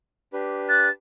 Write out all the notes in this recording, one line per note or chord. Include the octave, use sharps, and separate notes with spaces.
D4 G4 B4
F#6 A6